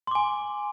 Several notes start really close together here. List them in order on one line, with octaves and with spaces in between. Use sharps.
C6 D6 G#5